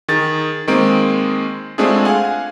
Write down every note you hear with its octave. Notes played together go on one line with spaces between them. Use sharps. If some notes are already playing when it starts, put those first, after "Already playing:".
D#3 G#4 A6
D#3 G#3 A#3 C4 D7
G#3 A3 C4 D4 F4 G#4
F5 F#5 G#5